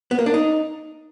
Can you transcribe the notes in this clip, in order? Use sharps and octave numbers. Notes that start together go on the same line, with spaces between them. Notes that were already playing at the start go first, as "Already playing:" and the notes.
B3
A#3
D4
D#4